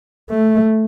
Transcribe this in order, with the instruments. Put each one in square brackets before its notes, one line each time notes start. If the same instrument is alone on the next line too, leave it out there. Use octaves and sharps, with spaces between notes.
[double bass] A3